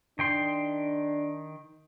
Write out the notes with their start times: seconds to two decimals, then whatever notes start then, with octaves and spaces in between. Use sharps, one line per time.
0.19 D#3 D4 G5 C6